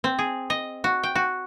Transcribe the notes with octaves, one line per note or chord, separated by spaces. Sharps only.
C4
G#4
D#5
F#4
G5
F#4